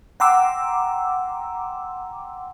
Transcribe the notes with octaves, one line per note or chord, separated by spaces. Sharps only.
F#5 G5 A#5 C6 D6 E6